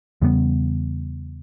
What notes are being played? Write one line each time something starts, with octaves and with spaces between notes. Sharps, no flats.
E2 C#3 G3 B3